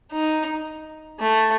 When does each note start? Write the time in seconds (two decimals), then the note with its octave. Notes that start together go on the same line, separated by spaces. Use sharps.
0.12 D#4
1.20 A3